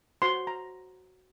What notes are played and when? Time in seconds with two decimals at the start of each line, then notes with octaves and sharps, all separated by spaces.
0.22 F#4 C5 C6
0.47 A#5